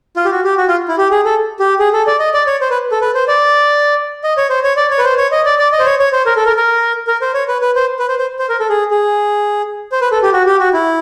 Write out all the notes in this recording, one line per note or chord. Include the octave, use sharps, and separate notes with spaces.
F4
G4
F#4
G4
F#4
F4
E4
G4
G#4
A4
G4
G#4
A4
D5
D#5
D5
C#5
C5
B4
A4
B4
C5
D5
D#5
C#5
C5
C#5
D5
C#5
B4
C5
C#5
D#5
D5
D5
D#5
C5
C#5
C#5
C5
A#4
A4
A#4
A#4
A#4
C5
C#5
B4
B4
C5
B4
C5
C5
C5
A#4
A4
G#4
G#4
C5
B4
A4
G4
F#4
G4
F#4
E4